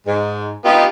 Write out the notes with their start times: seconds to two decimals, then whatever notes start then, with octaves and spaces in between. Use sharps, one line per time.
0.07 G#2
0.65 B3 D#4 F4 G4